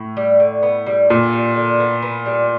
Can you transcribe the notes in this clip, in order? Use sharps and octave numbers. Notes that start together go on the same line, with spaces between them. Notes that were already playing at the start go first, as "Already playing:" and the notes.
Already playing: A2
G3
D3
B3
G3
A#2 D3
G3
D3
B3
B3
G3